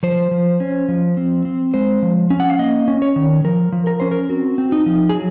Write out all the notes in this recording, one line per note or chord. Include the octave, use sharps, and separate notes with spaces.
F3 C5
F3
C#4
F3
C4
C4
G#3 C5
F3
C#4
F#5
F5
A#3 D#5
C#4
C#5
D#3
F3 A#4
F3
A#4
C#4 C5
A#4
C4 F#4
C4
D#4
F3
G#4
F#3